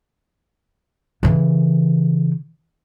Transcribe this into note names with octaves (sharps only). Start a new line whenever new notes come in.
C#3 E3